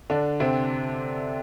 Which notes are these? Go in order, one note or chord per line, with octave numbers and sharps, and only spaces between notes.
D3 D4
C3 C4